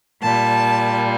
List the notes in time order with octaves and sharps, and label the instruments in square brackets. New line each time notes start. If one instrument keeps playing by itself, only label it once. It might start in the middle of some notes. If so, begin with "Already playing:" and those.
[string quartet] A#2 G3 A5